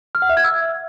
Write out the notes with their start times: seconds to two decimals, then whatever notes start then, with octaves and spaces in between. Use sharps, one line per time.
0.15 F6
0.22 F#5
0.29 E5
0.37 G#6
0.44 E6